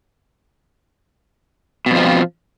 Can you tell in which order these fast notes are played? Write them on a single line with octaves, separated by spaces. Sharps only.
B2 F2 F3